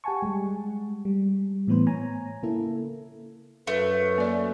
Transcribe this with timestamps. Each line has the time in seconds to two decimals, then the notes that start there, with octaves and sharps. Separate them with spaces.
0.04 G4 F#5 G#5 A5 C#6
0.22 G3 G#3
1.05 G3
1.68 A2 E3 B3 B4 C5
1.87 C#5 G#5 A#5
2.43 C#3 A#3 E4 A4
3.67 F#2 A3 B4
4.18 A#3 D5